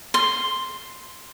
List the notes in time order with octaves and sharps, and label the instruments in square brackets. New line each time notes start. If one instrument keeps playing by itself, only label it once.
[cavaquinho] C6